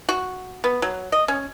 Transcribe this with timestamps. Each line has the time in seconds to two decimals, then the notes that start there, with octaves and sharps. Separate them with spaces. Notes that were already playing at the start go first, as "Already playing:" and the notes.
0.09 F#4
0.64 B3
0.82 F#3
1.12 D#5
1.28 C#4